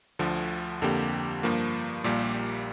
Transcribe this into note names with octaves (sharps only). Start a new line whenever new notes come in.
D2 D3 F3
F2 D3 A#3 G4
G2 F3 A#3
A#1 A#2 G3 A#3 G4